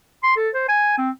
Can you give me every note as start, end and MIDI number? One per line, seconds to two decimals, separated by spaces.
0.23 0.34 84
0.37 0.49 69
0.54 0.67 72
0.68 0.95 80
0.98 1.10 60